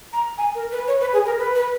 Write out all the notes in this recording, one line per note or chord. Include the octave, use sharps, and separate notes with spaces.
A#5
G#5
A#4
B4
C#5
B4
G#4
A#4
B4
B4